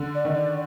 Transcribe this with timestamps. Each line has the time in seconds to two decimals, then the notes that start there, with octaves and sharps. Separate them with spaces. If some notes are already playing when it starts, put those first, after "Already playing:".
Already playing: D3
0.15 D5
0.25 D#3 D#5
0.36 D5